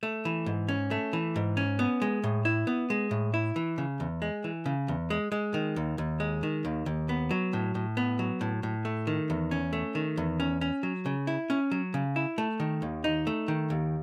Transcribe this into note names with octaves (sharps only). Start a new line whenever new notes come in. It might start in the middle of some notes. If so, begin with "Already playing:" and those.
A3
E3
G#2
C#4
A3
E3
G#2
C#4
B3
G#3
A2
E4
B3
G#3
A2
E4
E3
C#3
E2
G#3
E3
C#3
E2
G#3
G#3
D#3
D#2
D#2
G#3
D#3
D#2
D#2
B3
F#3
A2
A2
B3
F#3
A2
A2
A3
D#3
E2
C#4
A3
D#3
E2
C#4
C#4
F#3
C#3
E4
C#4
F#3
C#3
E4
A3
D#3
D#2
D#4
A3
D#3
D#2